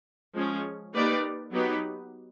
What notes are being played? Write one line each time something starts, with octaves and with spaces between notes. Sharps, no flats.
F3 G#3 C#4
A#3 D#4 G4 B4 D5
F#3 B3 D#4 G4 B4